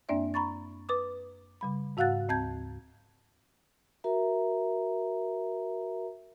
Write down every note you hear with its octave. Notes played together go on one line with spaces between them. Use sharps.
F#2 A#3 C4 D4 D5 E5
A#5 B5 C#6 A6
B4 D6 D#6
C#3 G3 B5
G#2 F#4 F5 F#5 F#6 A6
D2 C4 A5 G6 G#6
F#4 A#4 E5 A#5